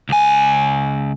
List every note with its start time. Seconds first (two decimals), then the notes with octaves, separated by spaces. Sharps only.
0.09 C#2 G#5